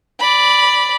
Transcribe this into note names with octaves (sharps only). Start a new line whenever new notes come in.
D5 B5